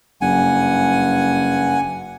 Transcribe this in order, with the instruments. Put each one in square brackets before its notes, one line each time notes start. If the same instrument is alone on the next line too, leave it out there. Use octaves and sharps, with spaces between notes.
[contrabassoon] F#1 [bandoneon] G2 F#5 [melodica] G#5